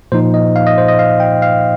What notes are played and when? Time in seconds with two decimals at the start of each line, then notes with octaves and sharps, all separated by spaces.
0.12 A#2 F3 D#4 C5
0.34 D#5
0.56 F5
0.67 D#5
0.78 C5
0.88 D#5
0.99 F5
1.20 G5
1.42 F5